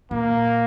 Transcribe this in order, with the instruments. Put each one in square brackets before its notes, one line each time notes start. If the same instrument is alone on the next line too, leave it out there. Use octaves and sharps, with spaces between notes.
[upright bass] A#2 [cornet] A#3